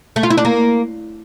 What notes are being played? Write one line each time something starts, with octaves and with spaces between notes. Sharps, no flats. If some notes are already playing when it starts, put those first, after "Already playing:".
A3
F4
E4
D4
A#3